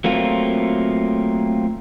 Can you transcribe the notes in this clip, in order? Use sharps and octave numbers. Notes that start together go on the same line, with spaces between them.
F#3 A3 A#3 C4 F4